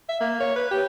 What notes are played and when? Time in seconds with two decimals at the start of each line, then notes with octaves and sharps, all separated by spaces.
0.09 E5
0.20 A#3
0.40 C#5
0.56 B4
0.71 G4